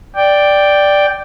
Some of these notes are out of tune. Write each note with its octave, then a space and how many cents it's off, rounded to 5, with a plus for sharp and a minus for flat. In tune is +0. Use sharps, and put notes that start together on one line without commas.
D5 +0 G5 +0